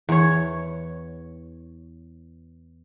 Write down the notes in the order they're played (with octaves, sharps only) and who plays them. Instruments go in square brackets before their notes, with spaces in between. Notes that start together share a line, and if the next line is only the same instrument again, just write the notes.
[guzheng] E2 C#5